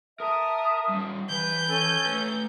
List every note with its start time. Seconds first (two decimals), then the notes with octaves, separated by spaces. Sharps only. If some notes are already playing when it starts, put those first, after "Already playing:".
0.20 A#4 E5 A5 A#5 D#6
0.89 G3 C#4
1.30 E3 B4 G6
1.68 C#4 A4 G#5
2.06 A3 B4